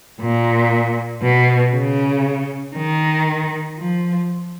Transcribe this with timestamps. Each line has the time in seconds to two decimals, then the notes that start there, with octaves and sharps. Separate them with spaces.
0.21 A#2
1.23 B2
1.74 C#3
2.76 D#3
3.79 F3